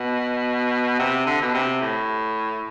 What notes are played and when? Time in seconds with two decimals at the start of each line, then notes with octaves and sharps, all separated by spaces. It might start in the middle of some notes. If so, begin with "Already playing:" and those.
Already playing: B2
0.99 C3
1.26 D3
1.42 B2
1.54 C3
1.82 A2